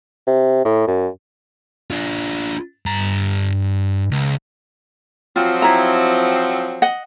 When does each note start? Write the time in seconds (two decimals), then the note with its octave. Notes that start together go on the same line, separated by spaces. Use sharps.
0.27 C3
0.65 A2
0.88 F#2
1.91 D4 F4
2.86 G2 A#5
4.11 C#2
5.36 F3 F#3 C4 F4
5.62 E4 A#5
6.82 D#5 F#5